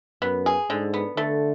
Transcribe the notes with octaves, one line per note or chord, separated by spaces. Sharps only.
F#2 B3
G#4
G#2 D3
B3
D3 A3